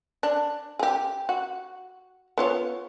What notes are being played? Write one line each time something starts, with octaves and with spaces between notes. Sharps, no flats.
D4
G4 G#4
F#4
B3 F4 C#5